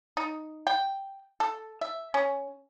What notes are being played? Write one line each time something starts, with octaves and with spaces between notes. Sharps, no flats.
D#4
G5
A4
E5
C#4